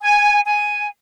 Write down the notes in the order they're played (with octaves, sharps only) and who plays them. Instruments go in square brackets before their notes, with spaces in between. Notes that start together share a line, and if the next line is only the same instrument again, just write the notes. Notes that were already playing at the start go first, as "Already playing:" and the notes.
[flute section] G#5
G#5